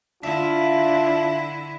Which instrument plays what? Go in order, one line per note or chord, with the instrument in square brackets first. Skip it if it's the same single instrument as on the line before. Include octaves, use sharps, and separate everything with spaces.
[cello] D3 E4 [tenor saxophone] D4 [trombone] F4 [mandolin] E5